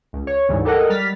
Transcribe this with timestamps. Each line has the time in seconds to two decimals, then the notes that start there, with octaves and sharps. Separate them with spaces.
0.13 C#2
0.27 C#5
0.49 D2 G#2 E3 G3
0.65 G4 A4 A#4 D#5 F#5
0.90 G3 F6 A6 B6